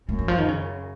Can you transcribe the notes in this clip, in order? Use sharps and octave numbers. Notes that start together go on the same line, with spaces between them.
F#2 A3
E3
F3
D#3
C#3